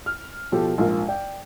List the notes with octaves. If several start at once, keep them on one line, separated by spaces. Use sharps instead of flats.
F6
B2 F3 G4 A4
A#1 G#2 F4 A#4
D5 G5